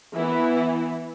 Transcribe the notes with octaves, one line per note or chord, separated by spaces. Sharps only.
E3 B3 E4